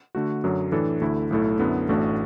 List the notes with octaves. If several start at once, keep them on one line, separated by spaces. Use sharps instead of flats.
D3 A3 F#4
F#2 D3 F#3
A2 E3 D4 A4
D2 D3 A3 E4
B1 A2 A3 E4 A4
F#2 D3 B3 E4
A1 A2 A3 D4 F#4